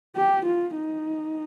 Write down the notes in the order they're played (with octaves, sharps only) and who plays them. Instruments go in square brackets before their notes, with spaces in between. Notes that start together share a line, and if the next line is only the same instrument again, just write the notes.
[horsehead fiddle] G4
F4
D#4